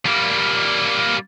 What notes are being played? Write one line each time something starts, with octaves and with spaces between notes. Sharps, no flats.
G3 A#3